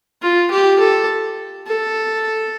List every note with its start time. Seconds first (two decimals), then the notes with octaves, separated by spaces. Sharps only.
0.22 F4
0.51 G4
0.80 A4
1.67 A4